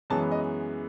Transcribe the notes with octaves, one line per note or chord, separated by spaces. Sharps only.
F#2 E3 G#3 B3 A5
D#5